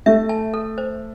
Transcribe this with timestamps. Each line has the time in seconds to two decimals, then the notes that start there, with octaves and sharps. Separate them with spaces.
0.06 A3 E5
0.29 A5
0.54 A4
0.78 C5